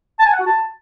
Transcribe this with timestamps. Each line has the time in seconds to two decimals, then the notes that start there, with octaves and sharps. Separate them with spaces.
0.19 A5
0.26 G#5
0.33 F#5
0.40 F#4
0.47 A5